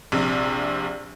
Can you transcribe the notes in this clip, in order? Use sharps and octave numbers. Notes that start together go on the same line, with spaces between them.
A#1 C3